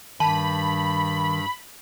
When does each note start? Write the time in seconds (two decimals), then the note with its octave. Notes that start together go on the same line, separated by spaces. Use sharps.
0.20 G2 D#3 A5 B5